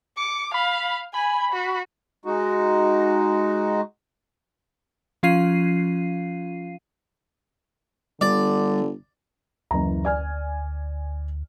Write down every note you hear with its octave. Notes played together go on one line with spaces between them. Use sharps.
D6 C#7
F5 B5
G#5 B5
F#4
G#3 D#4 F#4
F3 C#4 F4 F5 C7 D#7
G1 D3 G3 D5
F#1 D2 E3 A#5
D5 G#5 F6